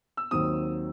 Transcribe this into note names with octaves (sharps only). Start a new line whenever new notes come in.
E6
D#2 D#3 F#3 C4 D#6